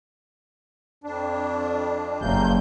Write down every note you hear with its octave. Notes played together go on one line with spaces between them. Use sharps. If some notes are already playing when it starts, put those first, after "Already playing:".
F2 D4
F#1 G2 A#3 G6